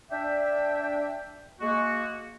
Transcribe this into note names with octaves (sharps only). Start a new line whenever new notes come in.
D4 E5 G5
G#3 A#3 F#4